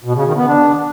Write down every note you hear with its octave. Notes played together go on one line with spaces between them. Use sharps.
B2
C#3
D#3
B3
D4